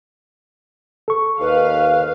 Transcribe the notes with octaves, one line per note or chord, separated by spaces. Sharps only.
A4 C#6
D#2 B4 F5